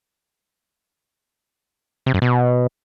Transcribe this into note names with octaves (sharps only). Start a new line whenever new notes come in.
C3
F#2
B2